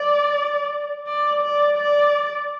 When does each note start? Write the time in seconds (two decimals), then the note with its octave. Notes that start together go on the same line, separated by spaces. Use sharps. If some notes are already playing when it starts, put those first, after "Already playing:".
Already playing: D5
1.07 D5
1.43 D5
1.78 D5